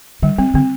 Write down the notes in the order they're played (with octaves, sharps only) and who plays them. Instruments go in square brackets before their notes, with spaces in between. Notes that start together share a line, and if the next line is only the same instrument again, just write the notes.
[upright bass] D3 [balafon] G3
[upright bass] G3 [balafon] C4
[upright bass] D3 [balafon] C4